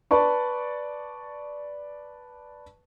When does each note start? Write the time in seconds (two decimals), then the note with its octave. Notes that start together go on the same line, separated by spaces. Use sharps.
0.11 B4 D5 A5 C#6